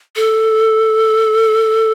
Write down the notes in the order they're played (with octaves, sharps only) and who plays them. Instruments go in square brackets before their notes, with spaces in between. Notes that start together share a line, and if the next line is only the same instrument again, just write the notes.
[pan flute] A4